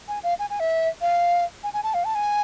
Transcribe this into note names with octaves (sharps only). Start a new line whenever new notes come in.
G#5
F5
G#5
G#5
E5
F5
G#5
G#5
A5
F5
A5
G#5